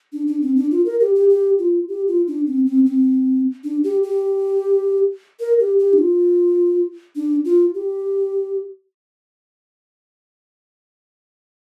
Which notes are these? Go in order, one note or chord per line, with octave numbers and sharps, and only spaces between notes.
D4
D4
C4
D4
F4
A#4
G4
G4
G4
F4
G4
F4
D4
C4
C4
C4
D4
G4
G4
A#4
G4
G4
D4
F4
D4
F4
G4